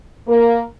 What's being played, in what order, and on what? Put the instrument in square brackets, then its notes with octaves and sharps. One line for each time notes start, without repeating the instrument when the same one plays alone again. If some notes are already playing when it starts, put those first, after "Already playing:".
[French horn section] A#3 A#4